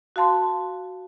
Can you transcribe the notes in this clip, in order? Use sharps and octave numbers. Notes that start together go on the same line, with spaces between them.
F#4 F5 A5 C6